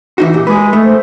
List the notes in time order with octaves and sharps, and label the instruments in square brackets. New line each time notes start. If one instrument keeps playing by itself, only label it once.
[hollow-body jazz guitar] E3 D#4 F#4
[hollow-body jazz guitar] A#2 [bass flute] G4
[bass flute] G#3 [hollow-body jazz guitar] G#4 B4
[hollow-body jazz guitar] A3
[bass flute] C5